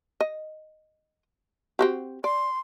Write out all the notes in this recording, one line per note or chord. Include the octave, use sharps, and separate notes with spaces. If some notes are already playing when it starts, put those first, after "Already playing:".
D#5
C4 F#4 G4
D5 C6